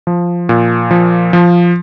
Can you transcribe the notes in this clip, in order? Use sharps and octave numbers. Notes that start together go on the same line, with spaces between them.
F3
A#2
F3
F3